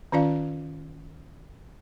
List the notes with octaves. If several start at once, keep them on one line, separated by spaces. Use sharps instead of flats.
D#3 C#4 F4 D5 F5